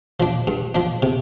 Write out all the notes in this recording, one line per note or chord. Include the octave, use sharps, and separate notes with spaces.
F3 D4
G2
F3 D4
C3